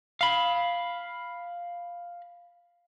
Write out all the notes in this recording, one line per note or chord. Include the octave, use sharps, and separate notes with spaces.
F5 B5